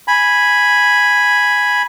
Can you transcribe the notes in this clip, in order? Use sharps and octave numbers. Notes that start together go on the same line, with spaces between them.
G#5 B5